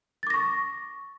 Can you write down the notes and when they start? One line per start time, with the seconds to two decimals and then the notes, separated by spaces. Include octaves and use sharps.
0.23 A6
0.27 D6
0.30 A#6
0.34 C#6